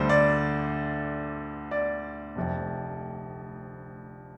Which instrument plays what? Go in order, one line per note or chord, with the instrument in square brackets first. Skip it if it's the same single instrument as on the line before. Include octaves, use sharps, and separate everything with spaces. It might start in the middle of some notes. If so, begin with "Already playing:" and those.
Already playing: [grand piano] D2 D3 G3 C5
D5
D5
F1 F2 C3